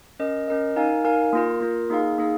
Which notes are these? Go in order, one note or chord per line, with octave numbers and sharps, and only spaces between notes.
C#4 A#4 D#5
C#4 A#4 D#5
D#4 A#4 F5 G#5
D#4 A#4 F5 G#5
A#3 F4 A#4
A#3 F4 A#4
A#3 D#4 G#4 F5
A#3 D#4 G#4 F5